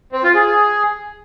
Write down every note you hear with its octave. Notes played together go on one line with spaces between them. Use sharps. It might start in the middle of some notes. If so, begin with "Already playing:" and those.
C4
F4
G#4